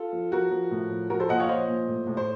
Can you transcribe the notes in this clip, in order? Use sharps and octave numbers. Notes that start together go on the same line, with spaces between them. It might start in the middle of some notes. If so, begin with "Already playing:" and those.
Already playing: F4 A4
F3
F3 F#4 A#4
F3
A2
F3
F3 F#4 A#4
A4 C5
A#2 D#5 F#5
C#5 F5
F3 C5 D#5
A#2
A2
A2
C5